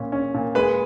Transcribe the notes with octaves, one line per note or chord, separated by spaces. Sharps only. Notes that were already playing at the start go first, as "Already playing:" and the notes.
Already playing: A#2 C#4
C#4
A#2
G#3 B4 B5